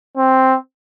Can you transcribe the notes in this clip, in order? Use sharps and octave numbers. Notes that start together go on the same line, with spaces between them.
C4